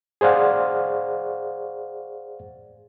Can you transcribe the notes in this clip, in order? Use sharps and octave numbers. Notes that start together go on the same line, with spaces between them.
G#4 C5 D5 F5 F#5